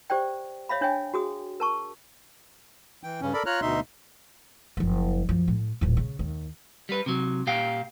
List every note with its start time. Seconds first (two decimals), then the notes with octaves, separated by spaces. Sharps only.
0.10 G4 C5 D5 G5
0.69 C#5 E5 F5 B5
0.81 D4 C#5 E5 G5 G#5
1.14 F#4 G#4 D#6
1.60 A#4 A5 C#6
3.04 E3 G5
3.22 G2 C#3 C#4
3.33 A4 A#4 D5 B5
3.46 F4 C#5 A#5 F6 F#6
3.61 D2 B2 D#4 E5 C6
4.77 F#1 F3
5.29 F#2 F3
5.48 A2
5.81 D#1 A1
5.97 C#3
6.19 D#2
6.89 G3 B4
7.06 C3 F#3
7.47 A#2 G4 F5 G5